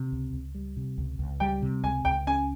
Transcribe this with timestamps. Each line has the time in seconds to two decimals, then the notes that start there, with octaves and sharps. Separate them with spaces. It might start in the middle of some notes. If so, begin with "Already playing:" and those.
Already playing: C3
0.12 C#2
0.33 C#2
0.55 G3
0.77 C3
0.98 C#2
1.19 C#2
1.40 G3 G5
1.62 C3
1.84 C#2 G#5
2.05 C#2 G5
2.27 C#4 G#5